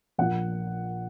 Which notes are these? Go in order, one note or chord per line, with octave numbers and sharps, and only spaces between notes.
A#1 A#2 F3 F#5